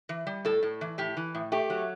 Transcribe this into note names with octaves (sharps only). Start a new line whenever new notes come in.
E3
G3
A2 A4
A2
E3
A2 G4
E3
A2
A3 G4
F#3